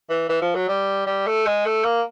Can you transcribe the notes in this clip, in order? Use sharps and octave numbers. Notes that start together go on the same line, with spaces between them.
E3
E3
F3
F#3
G3
G3
A3
G#3
A3
A#3